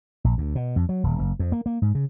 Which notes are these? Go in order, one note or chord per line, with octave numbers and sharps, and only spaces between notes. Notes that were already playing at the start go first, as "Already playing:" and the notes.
A#1
D2
B2
F2
F#3
D#1
F#1
F2
A#3
A#3
G#2
C#3